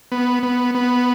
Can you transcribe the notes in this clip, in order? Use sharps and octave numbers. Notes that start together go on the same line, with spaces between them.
B3
B3
B3